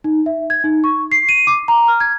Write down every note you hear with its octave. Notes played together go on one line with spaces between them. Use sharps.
D#4
E5
G#6
D#4
C#6
C7
D#7
D6
A#5
F6
G#6